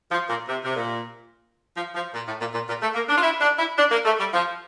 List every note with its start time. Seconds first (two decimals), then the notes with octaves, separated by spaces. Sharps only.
0.11 F3
0.29 A#2
0.47 C3
0.64 C3
0.75 A#2
1.76 F3
1.95 F3
2.13 A#2
2.26 A2
2.39 A#2
2.53 A#2
2.67 A#2
2.81 A3
2.94 A#3
3.08 D4
3.16 F4
3.22 E4
3.41 D4
3.58 E4
3.77 D4
3.91 A#3
4.05 A3
4.19 G3
4.32 F3